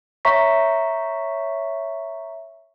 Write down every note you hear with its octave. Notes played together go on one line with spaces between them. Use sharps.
C#5 E5 A#5 C#6 B6